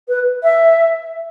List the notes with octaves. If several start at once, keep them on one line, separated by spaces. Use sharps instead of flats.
B4
E5